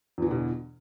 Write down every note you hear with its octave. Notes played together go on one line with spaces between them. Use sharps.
E2 G2 B2 D3 E3